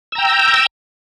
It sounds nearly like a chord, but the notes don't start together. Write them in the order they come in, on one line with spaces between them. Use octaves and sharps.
E6 A#5 G5